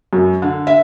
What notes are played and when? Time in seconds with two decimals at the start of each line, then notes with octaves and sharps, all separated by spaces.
0.13 F#2
0.42 D3
0.67 E5